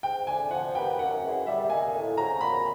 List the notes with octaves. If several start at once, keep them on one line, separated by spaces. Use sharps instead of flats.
G#2 G5
F3 A3 D4 G#5
F3 F#5
A#3 D#4 G4 B4 G5
F#2 F#5
C#3 E3 G#3
G3 E5
A#3 D#4 G#5
A2
F3 G#3 C#4 F#4 A#5
A#2 B5